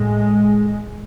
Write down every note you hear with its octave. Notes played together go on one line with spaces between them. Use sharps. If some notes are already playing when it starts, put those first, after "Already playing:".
Already playing: A2 G#3